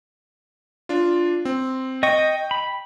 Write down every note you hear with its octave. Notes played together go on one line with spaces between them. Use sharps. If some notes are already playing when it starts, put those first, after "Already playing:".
D4 F4
C4
D#5 G5 C#6
B5